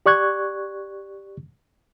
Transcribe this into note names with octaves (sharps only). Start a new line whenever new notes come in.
G4 D5 C#6 F#6 G#6